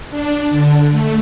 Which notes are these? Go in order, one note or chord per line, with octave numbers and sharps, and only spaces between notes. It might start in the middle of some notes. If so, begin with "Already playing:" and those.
D4
D3
A3